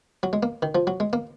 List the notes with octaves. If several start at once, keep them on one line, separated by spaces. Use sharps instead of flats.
F#3
G#3
A#3
D#3
F3
F#3
G#3
A#3